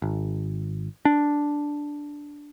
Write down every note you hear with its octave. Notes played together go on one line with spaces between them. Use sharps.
G#1
D4